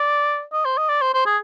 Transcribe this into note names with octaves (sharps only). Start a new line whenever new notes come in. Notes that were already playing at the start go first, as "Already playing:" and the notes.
Already playing: D5
D#5
C5
D#5
D5
C5
C5
G#4